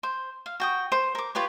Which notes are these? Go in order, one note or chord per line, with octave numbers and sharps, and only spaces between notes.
C5
F5
F#4 G5 D#6
C5
A#4 D6
F4 G4 B4 C#5